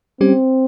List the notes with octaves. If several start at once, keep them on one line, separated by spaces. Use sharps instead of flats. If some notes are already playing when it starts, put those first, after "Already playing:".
G3 C4 C#4 G4